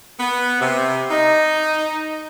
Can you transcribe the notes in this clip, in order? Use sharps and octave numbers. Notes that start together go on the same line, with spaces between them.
B3
C3
D#4